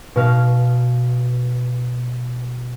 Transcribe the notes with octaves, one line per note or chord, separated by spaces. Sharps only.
B2 F5